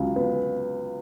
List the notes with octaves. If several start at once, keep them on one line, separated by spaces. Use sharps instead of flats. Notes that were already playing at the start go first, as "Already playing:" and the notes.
Already playing: C#2 C#3 F#3
B3